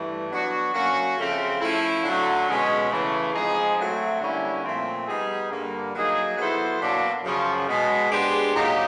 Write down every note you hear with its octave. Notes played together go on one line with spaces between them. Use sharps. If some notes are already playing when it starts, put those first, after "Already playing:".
Already playing: G2 E3 A3
F#3 B3 D4 F#4
F#3 A#3 C#4 F#4
C#3 F3 A3 C4
F3 A3 C#4 E4
D3 F#3 A3
B2 G#3 C#4
C#3 E3 A3
F3 G#3 C4 D#4 G#4
F#3 A3 C4
D3 G3 A#3 C#4 E4
A#2 F3 A3 C4
G3 B3 D#4 G#4
G2 D3 G3 A#3
F#3 A#3 D#4 G#4
F#3 B3 E4 A4 C5
B2 F#3 A#3 D4
F#2 C#3 F3
B2 G#3 B3
G#3 B3 D4 G4 C5
A#2 F#3 A#3 D#4 G4